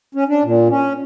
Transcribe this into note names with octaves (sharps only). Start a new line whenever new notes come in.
C#4
D4
A#2
C#4